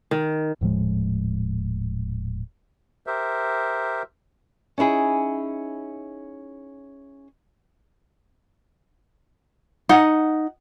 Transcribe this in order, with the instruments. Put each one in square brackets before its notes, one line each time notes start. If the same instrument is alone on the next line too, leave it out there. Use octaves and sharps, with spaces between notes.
[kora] D#3
[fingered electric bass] D#1 A2 F3 G#3
[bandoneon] G4 A#4 C5 E5
[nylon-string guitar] C#4 D#4 E4 G#4
[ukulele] D#4 F#5